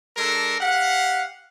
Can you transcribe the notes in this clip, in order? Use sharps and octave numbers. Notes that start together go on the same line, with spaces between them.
G#3 D4 A4 A#4
G4 F5 F#5